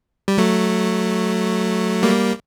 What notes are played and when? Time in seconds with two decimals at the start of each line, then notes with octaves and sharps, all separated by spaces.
0.28 G3
0.38 F#3 A3
2.03 G3 A#3